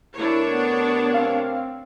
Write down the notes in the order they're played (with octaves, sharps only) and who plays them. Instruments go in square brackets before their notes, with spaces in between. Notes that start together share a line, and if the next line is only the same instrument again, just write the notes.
[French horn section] C3 A3 A#4 [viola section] D4 C#5 [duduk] E4
[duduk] B3
[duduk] C4 [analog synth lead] F5